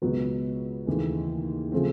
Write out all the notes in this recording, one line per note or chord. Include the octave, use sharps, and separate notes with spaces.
C#2 B2 F#3 B3
D#2 C#3 E3 A3
C#3 F3 A3 C4